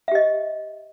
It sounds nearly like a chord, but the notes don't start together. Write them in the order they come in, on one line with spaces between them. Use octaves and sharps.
E5 G4 D#5